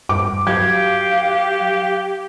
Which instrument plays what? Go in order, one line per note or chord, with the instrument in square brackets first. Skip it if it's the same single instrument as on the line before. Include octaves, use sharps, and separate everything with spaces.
[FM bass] G2 [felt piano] D6
[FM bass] F#3 [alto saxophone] G4 [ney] F5 [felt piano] G#6